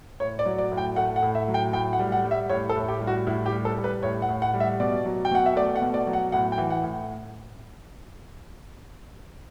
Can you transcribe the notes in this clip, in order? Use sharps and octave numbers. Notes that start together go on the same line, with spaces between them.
A2 C#5
D5
F#3
D5
A2
G5
A3 F#5
F#5
A2
E5
F#3
G5
A2 G5
F#5
G3
F#5
G3
E5
A2 C#5
A4
A2
G4
G3
F#4
A2 E4
G4
G3
A4
G3
B4
A2 C#5
F#5
A2
F#5
G3
E5
B2 D5
F#3
G5
B2 F#5
E5
A3 D5
F#5
B2
D5
F#3
F#5
A2 F#5
G5
E3
F#5
A2